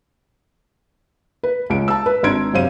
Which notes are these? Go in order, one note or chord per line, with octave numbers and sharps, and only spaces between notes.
B4
C#2 D7
A5 E6
B4
G#1 D4 A#5 C6 G#6 D7
F#2 C3 C5 F5 D#7